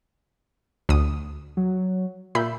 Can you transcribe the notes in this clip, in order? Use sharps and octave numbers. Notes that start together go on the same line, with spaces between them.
D2 D#6
F#3
A#2 E5 B5 G6